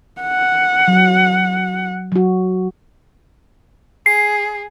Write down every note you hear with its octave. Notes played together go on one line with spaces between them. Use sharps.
F#5
F#3
F#3 F#4
G#4 C7